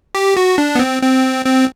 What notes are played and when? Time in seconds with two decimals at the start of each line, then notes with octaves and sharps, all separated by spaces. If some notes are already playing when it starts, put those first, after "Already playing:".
0.15 G4
0.37 F#4
0.58 D4
0.75 B3
0.79 C4
1.02 C4
1.45 C4